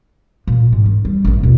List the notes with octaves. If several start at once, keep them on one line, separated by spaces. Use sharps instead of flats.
A#2
G#2
D#3
G3
A1 F#2
D#2 B2